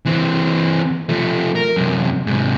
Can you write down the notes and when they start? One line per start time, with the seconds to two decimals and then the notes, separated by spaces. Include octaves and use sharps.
0.06 E3 C4
1.09 F3 A3
1.55 A#4
1.77 F#2 C3
2.27 G#2 C3